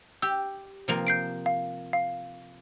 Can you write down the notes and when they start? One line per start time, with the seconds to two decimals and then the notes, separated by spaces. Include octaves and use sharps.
0.22 G4 E6
0.88 C3 F3 A#3
1.07 G6 C7 D7
1.46 F5
1.93 F5